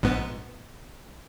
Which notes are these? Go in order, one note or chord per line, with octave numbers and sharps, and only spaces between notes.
A#1 G#2 B3